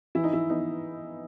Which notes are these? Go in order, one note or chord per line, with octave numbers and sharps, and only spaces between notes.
E3 E4
D#4
E4
B3 D#4